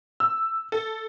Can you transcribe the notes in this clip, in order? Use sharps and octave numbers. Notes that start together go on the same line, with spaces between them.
E6
A4